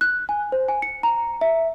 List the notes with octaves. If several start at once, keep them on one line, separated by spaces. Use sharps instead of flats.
F#6
G#5
C5
G#5
C#7
A#5
E5